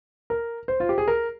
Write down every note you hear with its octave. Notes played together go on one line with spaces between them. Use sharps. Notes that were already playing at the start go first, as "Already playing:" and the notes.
A#4
C5
F4
G4
G#4
A#4